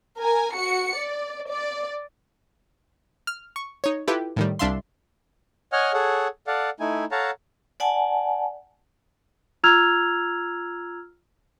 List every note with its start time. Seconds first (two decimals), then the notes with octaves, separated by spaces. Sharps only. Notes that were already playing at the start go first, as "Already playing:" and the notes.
0.17 A#4 G#5
0.55 F#4 C#7
0.96 D5
1.48 D5
3.27 F6
3.56 C#6
3.84 D#4 C#5
4.08 E4 F4 G4 A4 B4
4.36 A2 D#3 G3
4.59 C2 D4 E5 F5 C6
5.72 C#5 D#5 F#5 G#5 F6
5.93 G#4 A4 C#5 F#5
6.47 A4 D5 F5 F#5
6.80 A3 D#4 E4 G#5
7.11 A4 C#5 F5 F#5 A5 A#5
7.80 D5 F#5 G#5 A5
9.64 F4 A#5 E6 F6 G#6 F7